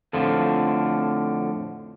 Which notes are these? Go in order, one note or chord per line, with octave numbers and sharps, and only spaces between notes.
F2 A2 D3 F3